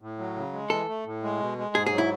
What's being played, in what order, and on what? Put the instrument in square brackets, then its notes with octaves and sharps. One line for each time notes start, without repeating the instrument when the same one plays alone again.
[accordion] A2
F#3
C#3
G#3
[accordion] E3 [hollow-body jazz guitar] A4
[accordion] A3
A2
G#3
B2
G#3
[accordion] G#2 [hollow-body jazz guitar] G#4
[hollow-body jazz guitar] G#4
[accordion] F#3
[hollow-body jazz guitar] E4